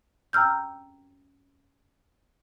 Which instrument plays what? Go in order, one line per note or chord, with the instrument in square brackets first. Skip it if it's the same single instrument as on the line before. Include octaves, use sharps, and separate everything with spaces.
[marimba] G5 A#5 E6 F6 G6